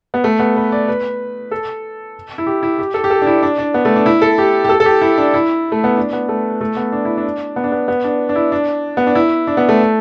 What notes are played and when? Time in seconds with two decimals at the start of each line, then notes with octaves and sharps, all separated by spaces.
0.14 B3
0.24 A3
0.39 B3
0.57 B4
0.72 D5
0.88 B4
1.51 A4
2.38 E4
2.46 G4
2.63 E4
2.79 G4
2.94 A4
3.04 G4
3.10 A4
3.22 D4
3.27 E4
3.43 D4
3.58 D4
3.74 B3
3.85 A3
3.96 D4
4.06 E4
4.22 A4
4.38 G4
4.64 G4
4.69 A4
4.80 A4
4.86 G4
5.01 E4
5.18 D4
5.34 E4
5.72 A3
5.84 B3
5.97 D4
6.13 B3
6.29 A3
6.61 A3
6.77 B3
6.92 D4
7.05 E4
7.17 D4
7.56 B3
7.64 D4
7.72 B3
7.88 B3
8.04 D4
8.29 D4
8.35 E4
8.52 D4
8.97 B3
9.07 D4
9.15 E4
9.47 D4
9.57 B3
9.69 A3